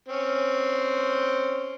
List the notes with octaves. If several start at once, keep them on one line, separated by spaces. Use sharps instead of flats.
C4 C#4